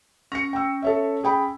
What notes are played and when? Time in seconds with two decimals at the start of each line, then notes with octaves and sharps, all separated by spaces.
0.32 C#4 A#6 C#7
0.53 G5 E6
0.82 A4 C#5 E5
1.24 G#4 G5 B5